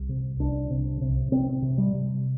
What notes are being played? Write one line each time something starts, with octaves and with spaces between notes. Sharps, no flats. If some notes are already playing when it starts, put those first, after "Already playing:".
Already playing: C2
C3
C2 D4
C3
C3
C3 C4
C3
G3
C3